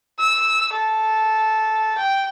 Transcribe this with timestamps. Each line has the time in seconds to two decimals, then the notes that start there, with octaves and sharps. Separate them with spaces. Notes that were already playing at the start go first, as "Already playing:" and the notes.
0.19 E6
0.73 A4
1.98 G5